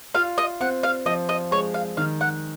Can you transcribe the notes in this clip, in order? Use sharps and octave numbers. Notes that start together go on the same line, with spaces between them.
F4 F5
D#5
C4 F#5
F5
F3 D#5
D#5
G#3 C#5
F5
D#3 F5
F#5